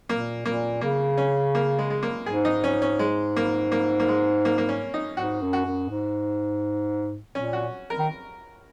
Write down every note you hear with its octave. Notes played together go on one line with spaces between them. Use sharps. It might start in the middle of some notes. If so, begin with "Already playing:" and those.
A#2 A#3
A#2 A#3
C#3 A#3
C#4
A#3
G#3
G#3
A#3
G#2 G#4
D#4
C#4
C#4
G#3
A#3
A#3
A#3
G#3
A#3
A#3
C#4
D#4
G#2 F#4
F#2
F#4
F#2
G#2
A#2 C#4
F#4
A#4
D#3